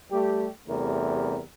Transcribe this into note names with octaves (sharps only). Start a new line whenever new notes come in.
G3 A3 G4
E2 C3 G3 A3 A#4